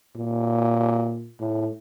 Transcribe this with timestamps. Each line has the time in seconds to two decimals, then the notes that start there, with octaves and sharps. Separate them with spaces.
0.16 A#2
1.39 A2